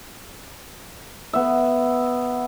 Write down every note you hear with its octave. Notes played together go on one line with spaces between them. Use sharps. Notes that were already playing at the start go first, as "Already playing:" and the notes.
B3 E5